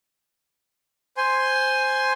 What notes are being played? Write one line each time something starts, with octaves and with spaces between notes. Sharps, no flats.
C5 G#5 C6